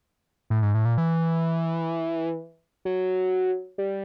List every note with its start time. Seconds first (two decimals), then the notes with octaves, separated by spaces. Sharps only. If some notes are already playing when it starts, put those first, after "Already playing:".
0.50 A2
0.62 G#2
0.74 A2
0.85 A#2
0.98 E3
2.85 F#3
3.78 G3